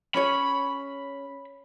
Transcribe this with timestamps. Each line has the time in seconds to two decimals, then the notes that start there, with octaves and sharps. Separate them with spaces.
0.15 C#4 G#4 C#5 B5